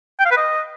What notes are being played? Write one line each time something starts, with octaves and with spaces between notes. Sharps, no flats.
G5
F5
B4
D#5